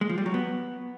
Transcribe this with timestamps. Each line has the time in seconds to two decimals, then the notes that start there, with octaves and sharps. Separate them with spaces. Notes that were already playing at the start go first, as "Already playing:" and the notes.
0.01 G#3
0.09 F3
0.18 G3
0.26 F#3
0.34 B3